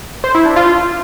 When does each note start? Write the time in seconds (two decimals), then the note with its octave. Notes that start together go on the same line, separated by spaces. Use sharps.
0.24 C5
0.35 E4
0.46 D4
0.56 F4